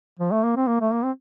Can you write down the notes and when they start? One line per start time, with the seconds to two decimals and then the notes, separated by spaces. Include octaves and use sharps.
0.19 F3
0.32 A3
0.44 A#3
0.56 C4
0.68 A#3
0.81 A3
0.92 A#3
1.04 C4